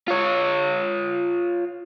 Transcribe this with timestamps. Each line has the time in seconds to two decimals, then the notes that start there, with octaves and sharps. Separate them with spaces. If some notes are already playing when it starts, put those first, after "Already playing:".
0.08 F4 C#5